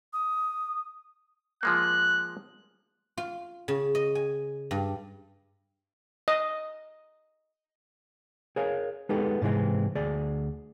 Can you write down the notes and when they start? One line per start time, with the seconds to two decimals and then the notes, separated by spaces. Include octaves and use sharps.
0.13 D#6
1.63 F3 G#3 A#3 F#6
3.17 F4
3.68 C#3
3.95 D#5
4.15 G#5
4.71 G2
6.28 D#5
8.56 G#4 A#4 C#5 F5
9.09 G#3 B3 D#4 G4 A4
9.42 G#2 C3 E3 G#3 C4
9.95 D2 G#4 D5